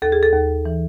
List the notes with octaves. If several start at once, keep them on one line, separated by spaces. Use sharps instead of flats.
D#2 A4
G#4
A4
D#2
E3